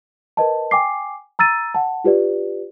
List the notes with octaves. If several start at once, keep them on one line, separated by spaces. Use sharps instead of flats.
A#4 B4 D#5 A5
G5 G#5 D6 C7
A#5 E6 A6 D#7
F#5 A5
F4 G4 B4 D5